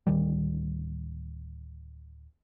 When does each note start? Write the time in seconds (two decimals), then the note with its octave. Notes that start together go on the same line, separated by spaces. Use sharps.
0.07 D1 D#3 G3